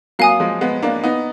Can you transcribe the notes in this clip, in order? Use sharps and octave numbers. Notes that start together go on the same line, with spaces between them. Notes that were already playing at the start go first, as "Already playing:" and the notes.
F#3 A#3 F5 G#5 D#6
F3 G#3
G#3 B3
A#3 D4
B3 D#4